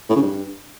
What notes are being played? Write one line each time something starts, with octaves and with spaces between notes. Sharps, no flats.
A2
C#3
G2